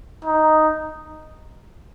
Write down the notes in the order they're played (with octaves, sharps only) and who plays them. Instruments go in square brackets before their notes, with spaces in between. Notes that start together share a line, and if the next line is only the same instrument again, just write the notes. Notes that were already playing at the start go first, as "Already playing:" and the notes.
[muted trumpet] D#4